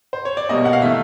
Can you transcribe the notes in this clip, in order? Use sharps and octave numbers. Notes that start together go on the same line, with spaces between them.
C5
C#5
D5
B2 G3 A#3 D#5
F#5
F5
E3 A3 E5